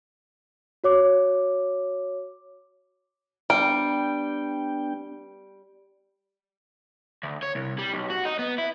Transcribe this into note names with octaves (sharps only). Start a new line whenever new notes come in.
F#4 C#5 D6
G3 B3 D4 G5 D7
D2
C#5
C2
G3
B1
F#4
D#4
B3
E4